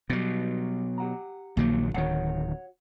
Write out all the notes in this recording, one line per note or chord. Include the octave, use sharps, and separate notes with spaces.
B2 F#3 G3
G4 F#5 A#5
A#1 D#3 F#3 A#3
D1 D#3 F#4 C#5 F#5